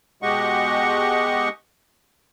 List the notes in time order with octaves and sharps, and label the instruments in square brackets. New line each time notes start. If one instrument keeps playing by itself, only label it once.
[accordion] B2 G#3 G4 D#5 F#5 C#6